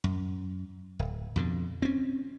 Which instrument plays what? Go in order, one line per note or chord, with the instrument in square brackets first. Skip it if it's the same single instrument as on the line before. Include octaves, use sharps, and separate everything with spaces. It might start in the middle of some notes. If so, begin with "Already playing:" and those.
[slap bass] F#2
D1
F2 B2 D3
C4 C#4